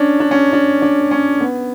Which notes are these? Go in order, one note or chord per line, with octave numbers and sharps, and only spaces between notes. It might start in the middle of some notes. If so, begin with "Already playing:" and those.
Already playing: C#4 D4
D4
C#4
D4
D4
C#4
B3